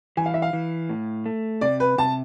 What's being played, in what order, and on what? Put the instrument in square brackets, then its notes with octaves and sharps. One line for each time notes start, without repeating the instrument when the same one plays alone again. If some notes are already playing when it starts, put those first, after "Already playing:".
[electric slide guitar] E3 [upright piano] G#5
[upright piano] F5
E5
F5
[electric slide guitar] E3
A2
A3
[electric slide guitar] C3 [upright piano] D5
[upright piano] B4
[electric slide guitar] C3 [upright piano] A5